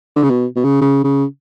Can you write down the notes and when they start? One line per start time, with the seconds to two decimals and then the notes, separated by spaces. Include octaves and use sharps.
0.16 D3
0.23 C#3
0.30 B2
0.56 B2
0.64 C#3
0.81 C#3
1.04 C#3